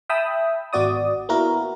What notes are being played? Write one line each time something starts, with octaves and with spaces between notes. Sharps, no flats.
E5 G5 A5 B5 D#6 E6
G#1 B3 F#4 D5 D#6
A#3 B3 E4 F#4 A#4